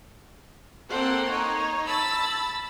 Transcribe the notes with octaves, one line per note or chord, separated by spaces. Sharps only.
A#3 C4 A4 C5 F#5
D#4 C#5
A5 B5 E6 A6